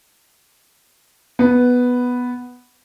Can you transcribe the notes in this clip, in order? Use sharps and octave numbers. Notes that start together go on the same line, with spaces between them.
B3